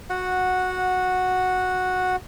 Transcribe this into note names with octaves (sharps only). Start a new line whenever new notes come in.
F#4 F#5